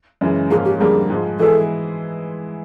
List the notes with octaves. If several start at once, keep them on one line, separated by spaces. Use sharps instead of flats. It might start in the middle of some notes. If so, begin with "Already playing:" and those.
F#2 C#3 E3 G#3
G#2 F3 A#3 C#4 F4 G#4
G4
F2 D3 G3 A#3 G#4
G#2 F3 G#3
E3 G#3 B3 E4 G#4 A4